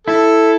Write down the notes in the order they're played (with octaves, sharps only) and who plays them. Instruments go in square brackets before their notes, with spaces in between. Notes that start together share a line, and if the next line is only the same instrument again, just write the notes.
[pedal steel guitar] E4 [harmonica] A4